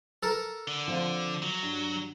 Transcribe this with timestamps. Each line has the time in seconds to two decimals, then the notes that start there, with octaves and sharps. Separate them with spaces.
0.23 A4 A#4
0.68 D3
0.88 F3 C4 F4
1.42 F#3
1.63 G2